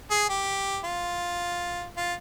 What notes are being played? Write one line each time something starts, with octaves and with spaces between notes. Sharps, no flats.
G#4
G4
F4
F4